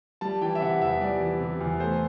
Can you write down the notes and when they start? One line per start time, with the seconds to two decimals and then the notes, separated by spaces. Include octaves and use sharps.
0.21 G3 A5
0.41 E3 G5
0.55 E5
0.61 C3 F#5
0.81 E2 E5
1.01 G3 D5
1.21 E3
1.40 C3
1.61 E2
1.80 A3 C5